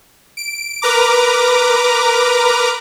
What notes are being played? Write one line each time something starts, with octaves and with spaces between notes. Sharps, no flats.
D7
A#4 B4 A#5 D6